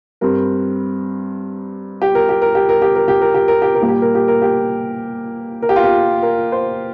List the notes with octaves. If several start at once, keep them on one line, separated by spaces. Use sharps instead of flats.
G2 G3 C4 A#4
G4
A#4
G4
A#4
G4
A#4
G4
A#4
G4
A#4
G4
A#4
G4
A#4
A#2 G3 A#3
G4
A#4
G4
A#4
G4
A#4
G4
F4
G4
A#4
C5